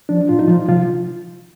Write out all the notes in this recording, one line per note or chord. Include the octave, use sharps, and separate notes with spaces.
F3 D4
A#2 F4
D#4
F3 F4
C3 F3 F4